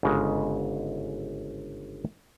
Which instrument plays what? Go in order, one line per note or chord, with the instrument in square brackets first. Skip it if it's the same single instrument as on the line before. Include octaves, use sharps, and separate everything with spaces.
[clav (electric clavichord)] G1 G#2 C#3 G#3 D#5